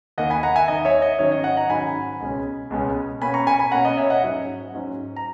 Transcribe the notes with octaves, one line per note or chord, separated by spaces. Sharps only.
D#2 D#3 A#3 D#5 F#5
G#5 B5
F#5 A#5
E5 G#5
D#2 D#3 A#3 D#5
C#5 E5
D#5
G#2 D#3 F#3 C#4 C#5
D#5
D#5 F#5
F#5 A#5
G#2 D#3 F#3 C#4 G#5 B5
C#2 B2 G#3 C#4
C#2 B2 G#3 C#4
B2 A#3 C#4 G#5 B5
A#5 C#6
G#5 B5
G#5 B5
B2 A#3 C#4 F#5 A#5
D#5
C#5 E5
D#5 F#5
G#2 F#3 C#4
G#2 F#3 C#4
A#5